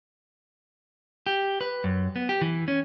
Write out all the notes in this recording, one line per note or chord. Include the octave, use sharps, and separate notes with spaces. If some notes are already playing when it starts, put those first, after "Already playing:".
G4
B4
F#2
B3
G4
E3
C#4